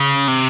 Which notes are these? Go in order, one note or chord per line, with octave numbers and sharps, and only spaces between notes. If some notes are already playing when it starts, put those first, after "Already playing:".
Already playing: C#3
C3